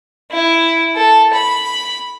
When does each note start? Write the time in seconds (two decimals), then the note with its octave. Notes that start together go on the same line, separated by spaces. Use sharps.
0.32 E4
0.96 A4
1.33 B5